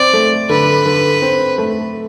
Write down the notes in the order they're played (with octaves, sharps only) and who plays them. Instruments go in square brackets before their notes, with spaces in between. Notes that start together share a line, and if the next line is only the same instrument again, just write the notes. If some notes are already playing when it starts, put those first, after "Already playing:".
Already playing: [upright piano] C4 [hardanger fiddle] D5
[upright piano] A3
[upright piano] D3 [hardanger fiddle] B4
[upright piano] D3
C4
A3